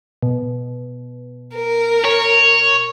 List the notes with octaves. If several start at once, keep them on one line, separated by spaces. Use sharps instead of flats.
B2
A#4
C#5